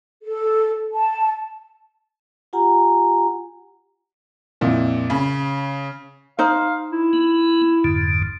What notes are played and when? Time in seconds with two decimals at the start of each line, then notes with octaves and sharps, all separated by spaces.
0.23 A4
0.93 A5
2.53 F4 G4 F#5 G#5 A#5
4.61 F2 A#2 E4
5.10 C#3 B5
6.39 D#4 C5 F5
6.92 E4
7.13 B3
7.84 F2 G#2 D3